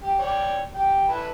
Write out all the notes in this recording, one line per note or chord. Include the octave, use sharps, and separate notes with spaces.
G4
C#5 D5 G5
G4 G5
E4 A4 B4